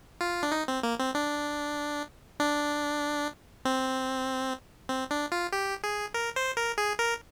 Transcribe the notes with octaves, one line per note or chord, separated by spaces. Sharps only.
F4
D4
D#4
C4
A#3
C4
D4
D4
C4
C4
D4
F4
G4
G#4
A#4
C5
A#4
G#4
A#4